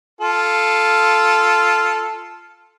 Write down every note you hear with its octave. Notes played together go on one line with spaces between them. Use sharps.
F4 A4